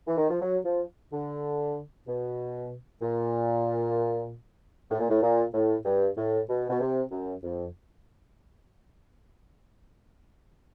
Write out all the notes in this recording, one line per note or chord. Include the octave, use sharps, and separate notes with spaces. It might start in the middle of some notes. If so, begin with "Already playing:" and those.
E3
D#3
F3
F#3
F3
D3
B2
A#2
A2
A#2
A2
A#2
A2
G2
A2
B2
B2
C3
F#2
F2